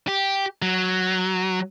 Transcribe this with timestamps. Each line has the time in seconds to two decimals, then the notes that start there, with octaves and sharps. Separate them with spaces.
0.08 G4
0.62 F#3